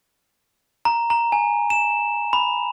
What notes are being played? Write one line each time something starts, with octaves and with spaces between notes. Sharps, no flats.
A#5
A#5
G#5
E7
B5